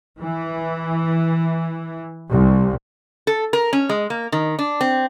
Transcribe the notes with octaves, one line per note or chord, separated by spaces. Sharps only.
E3
C2
A4
A#4
C#4
G#3
A#3
D#3
D4
C4